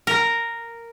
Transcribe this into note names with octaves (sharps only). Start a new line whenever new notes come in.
A#4